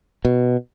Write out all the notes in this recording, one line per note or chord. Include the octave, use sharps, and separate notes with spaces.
B2